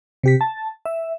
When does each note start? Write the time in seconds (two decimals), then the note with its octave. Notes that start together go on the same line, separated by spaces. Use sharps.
0.23 C3 G4 B6
0.41 A5
0.85 E5